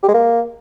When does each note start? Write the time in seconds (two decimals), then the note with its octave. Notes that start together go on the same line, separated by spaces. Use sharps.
0.03 G4
0.08 G#3
0.14 A#3